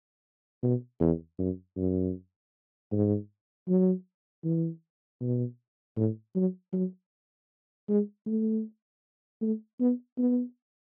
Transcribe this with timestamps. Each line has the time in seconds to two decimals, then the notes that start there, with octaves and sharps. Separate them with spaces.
0.63 B2
1.00 E2
1.39 F#2
1.77 F#2
2.92 G#2
3.68 F#3
4.44 E3
5.21 B2
5.97 A2
6.35 F#3
6.73 F#3
7.88 G#3
8.26 A3
9.42 A3
9.80 B3
10.18 B3